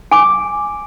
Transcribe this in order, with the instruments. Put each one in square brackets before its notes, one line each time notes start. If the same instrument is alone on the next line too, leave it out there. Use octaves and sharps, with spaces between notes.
[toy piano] G#5 D6